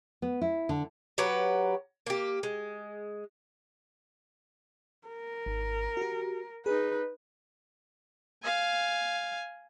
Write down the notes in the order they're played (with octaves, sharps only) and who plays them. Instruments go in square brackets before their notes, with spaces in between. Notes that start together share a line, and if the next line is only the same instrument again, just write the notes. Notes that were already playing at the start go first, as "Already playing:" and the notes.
[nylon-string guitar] B3
E4
D3
[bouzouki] F#3 G4 B4 F#5
A#3 G4
G#3
[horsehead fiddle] A#4
[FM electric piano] G#1
F#4 G4
[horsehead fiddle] D#4 B4 [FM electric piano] G#4
[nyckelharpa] F5 G#5